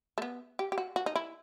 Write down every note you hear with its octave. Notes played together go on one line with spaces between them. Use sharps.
A3
B3
G4
G4
F#4
F#4
D#4
E4